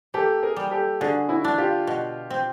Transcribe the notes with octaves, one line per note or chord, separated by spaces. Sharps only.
A#3 G4 A4
G#4 A#4
G3
G4 A4
D3 F#4 G#4
E4 F#4
D4
F4 G4
B2
C4